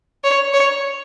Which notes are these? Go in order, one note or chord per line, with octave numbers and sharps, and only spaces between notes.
C#5
C#5